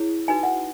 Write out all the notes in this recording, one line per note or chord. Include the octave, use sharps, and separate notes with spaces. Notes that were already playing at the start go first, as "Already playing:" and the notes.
Already playing: E4 G#4 C#5
D#4 F#4 B4 G#5
F#5